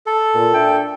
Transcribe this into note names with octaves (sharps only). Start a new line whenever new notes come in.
A4
A#2
D4 E5 G5